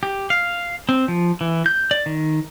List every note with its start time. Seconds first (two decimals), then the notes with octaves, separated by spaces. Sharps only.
0.03 G4
0.30 F5
0.89 C4
1.08 F3
1.41 E3
1.66 G6
1.91 D5
2.06 D#3